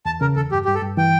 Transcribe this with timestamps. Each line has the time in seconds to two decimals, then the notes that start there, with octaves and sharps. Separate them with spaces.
0.06 E2 A5
0.21 C#3 A#4
0.36 E2 A4
0.52 G2 G4
0.65 G2 G4
0.75 A4
0.82 G2
0.97 E3 G5